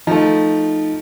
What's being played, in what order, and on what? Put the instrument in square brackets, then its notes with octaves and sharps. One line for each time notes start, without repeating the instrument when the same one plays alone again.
[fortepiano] F3 A3 [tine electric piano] D#4